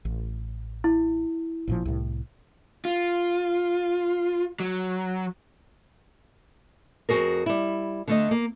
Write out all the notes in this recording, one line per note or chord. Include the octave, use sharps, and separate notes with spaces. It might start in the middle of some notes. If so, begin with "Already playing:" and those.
A1
E4
A1 A#2 F3
C2 A2
F4
F#3
F2 F#3 F#4 G#4 A#4
G3 E4
D3 A3 D#5
A#3